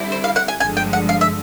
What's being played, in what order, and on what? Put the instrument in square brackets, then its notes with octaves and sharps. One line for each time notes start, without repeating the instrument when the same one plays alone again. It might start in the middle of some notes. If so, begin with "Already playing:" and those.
Already playing: [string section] D3 G3 C4 E4
[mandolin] C5
F5
F#5
G#5
[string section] G1 G2 D3 F3 G#3 [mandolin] G#5
[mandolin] G5
F#5
F5
E5